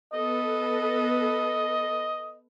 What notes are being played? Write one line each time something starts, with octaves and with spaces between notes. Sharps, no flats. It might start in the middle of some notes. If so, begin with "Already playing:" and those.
B3 A4 B4 D#5